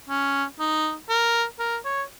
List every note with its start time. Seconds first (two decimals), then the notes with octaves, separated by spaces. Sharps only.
0.09 C#4
0.59 D#4
1.09 A#4
1.59 A#4
1.85 C#5